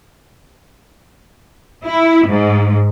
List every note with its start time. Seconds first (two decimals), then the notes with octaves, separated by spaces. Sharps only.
1.85 E4
2.27 G#2